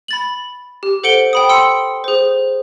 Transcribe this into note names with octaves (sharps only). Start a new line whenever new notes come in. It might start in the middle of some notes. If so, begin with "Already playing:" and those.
B5 A6 F#7
G4
A4 C5 F#5 C#7 D7 G7
G5 B5 D#6
C6 E6 C#7
G#4 C5